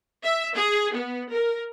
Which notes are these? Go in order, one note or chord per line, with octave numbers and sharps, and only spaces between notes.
E5
G#4
B3
A#4